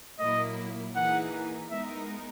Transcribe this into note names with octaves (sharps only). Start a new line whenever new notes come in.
A#2 F#3 A#3 E4 D#5
E3 A#3 D#4 G#4 F#5
G#3 B3 D#4 A#4 E5